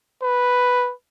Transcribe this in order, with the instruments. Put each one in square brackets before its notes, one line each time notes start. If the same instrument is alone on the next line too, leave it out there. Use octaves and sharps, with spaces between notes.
[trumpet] B4